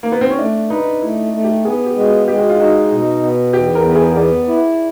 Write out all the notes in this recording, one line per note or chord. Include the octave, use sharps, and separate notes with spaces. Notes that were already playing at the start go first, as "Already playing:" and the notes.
A#3
B3
C4
C#4
A3 D4
D#4 B4
A3 E4
A3
G4
B3 G#4
G4
G#3 F#4
F4
G#3 G4
F#4
F4
D#4 F#4
B2
B3
E2 G4
A#4
B3
G#4
B3 D5
E4